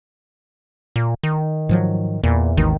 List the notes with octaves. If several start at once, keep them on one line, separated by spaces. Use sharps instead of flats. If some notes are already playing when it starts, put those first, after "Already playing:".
A#2
D#3
G#2 F3 F#3
E2 A#2
G#1 D#2 D#3 E3